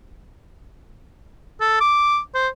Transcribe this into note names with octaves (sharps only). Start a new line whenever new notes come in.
A4
D6
C5